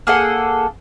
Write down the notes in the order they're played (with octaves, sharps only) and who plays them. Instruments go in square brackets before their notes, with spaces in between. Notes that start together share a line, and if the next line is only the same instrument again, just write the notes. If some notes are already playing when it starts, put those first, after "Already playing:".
[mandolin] A#3 G#4 A4 F#5